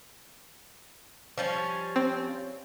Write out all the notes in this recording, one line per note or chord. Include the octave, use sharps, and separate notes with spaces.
F3 G3 C#4
C4